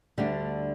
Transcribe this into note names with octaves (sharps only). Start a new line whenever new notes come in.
D2 D3 G3 D4